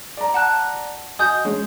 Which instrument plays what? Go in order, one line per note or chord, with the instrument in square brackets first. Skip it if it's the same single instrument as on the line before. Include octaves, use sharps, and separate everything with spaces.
[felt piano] D5 A#5
[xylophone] F#5 A5 F#6
[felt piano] F#4 D#5 G#5 [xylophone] D#6 G6
[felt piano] G#3 C#4